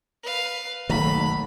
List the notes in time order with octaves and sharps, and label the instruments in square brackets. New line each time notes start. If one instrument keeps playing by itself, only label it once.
[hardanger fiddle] B4 F5
[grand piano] F#1 B1 B6 [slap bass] D#3 A3 [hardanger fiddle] B5